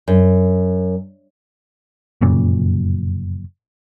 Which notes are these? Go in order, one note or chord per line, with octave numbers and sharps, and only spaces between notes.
F#2
F1 F#2 A#2 C#3